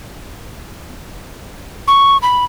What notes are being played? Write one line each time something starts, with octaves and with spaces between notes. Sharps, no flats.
C#6
B5